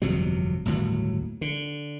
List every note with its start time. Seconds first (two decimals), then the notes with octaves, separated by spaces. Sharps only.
0.02 G1 F2 C3 F#3
0.65 G1 D#2 A2 F#3
1.41 D3